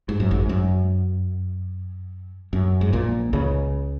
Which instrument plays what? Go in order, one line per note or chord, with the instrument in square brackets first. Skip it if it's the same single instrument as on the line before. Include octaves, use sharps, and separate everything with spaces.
[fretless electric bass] G#2
F#2
G#1 G#2
F#2
F#2
G#2
A#1 A#2
C#2 C#3